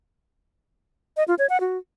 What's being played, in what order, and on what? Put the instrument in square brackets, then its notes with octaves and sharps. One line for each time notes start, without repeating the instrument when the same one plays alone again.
[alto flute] D#5
F4
C#5
F#5
F#4